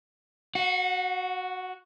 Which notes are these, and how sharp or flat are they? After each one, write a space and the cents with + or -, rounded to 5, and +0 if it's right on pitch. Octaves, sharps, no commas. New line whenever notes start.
F#4 +0 F#5 -35